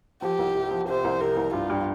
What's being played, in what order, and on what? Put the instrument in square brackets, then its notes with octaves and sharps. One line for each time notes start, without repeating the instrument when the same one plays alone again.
[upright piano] F3 [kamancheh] G4
[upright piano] C2
C3
F3
[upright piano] C3 [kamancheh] C5
[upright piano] C2
[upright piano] C3 [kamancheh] A#4
[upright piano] C2
[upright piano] G2 [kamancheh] F4
[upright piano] G2